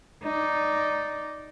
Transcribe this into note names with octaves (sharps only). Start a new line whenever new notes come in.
D#4 D5